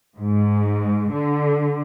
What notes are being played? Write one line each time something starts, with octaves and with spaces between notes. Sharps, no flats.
G#2
D3